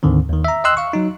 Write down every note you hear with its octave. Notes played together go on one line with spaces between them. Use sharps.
D2 G#2 D3 D#3 C4
D#2 D#3
E5 A#5
D#5 G5 C6 E6 F#6
F5 C#6
F#3 D#4